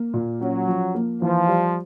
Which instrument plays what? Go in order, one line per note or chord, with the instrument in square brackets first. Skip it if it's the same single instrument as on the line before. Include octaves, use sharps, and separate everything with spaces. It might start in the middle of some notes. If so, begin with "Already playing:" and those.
Already playing: [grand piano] A#3
A#2
[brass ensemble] F#3 [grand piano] C#4
[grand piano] F3
A#3
[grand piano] E3 [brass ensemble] F3
[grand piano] G3